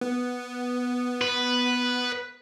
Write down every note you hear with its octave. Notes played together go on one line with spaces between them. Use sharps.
B3
B4